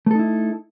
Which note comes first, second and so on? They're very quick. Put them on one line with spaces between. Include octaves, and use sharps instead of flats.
A3 A4 D#4 E4